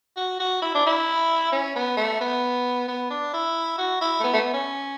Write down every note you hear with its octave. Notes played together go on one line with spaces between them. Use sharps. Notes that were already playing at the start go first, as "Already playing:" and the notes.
F#4
F#4
E4
D4
E4
C#4
B3
A3
B3
B3
D4
E4
F#4
E4
A3
B3
A3
B3
C#4